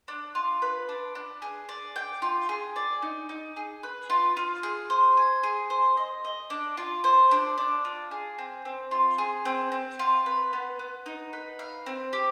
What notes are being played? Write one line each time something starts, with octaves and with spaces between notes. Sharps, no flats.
D4
F4
B4
D4
D4
G#4
D5
G5
F4
G#4
D5
D#4
D#4
G#4
B4
F4
F4
G#4
C5
G#5
G#4
C5
D#5
D#5
D4
F4
C5
D4
D4
F4
G#4
C4
C4
F4
G#4
C4
C4
F4
B4
B3
B3
D#4
B4
F5
C4
G4